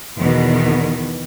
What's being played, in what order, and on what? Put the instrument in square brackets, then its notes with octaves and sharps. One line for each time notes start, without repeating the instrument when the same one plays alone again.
[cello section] E2 B2 D#3 B3